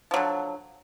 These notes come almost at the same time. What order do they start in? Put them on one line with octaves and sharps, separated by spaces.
F3 F#3 D3